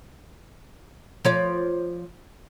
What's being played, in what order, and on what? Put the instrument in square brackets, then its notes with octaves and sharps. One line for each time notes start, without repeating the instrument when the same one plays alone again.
[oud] F3 C#5 D5